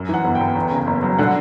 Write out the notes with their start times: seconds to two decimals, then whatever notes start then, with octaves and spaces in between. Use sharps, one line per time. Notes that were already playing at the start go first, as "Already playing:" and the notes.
Already playing: F#2
0.09 E3 F#5
0.25 G1
0.35 G5
0.41 G1
0.55 E2 G5
0.72 C#3
0.87 F#1
1.03 F#3
1.18 D3 F#5